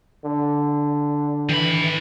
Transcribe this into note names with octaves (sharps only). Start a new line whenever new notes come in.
D3
D#3 E3 B5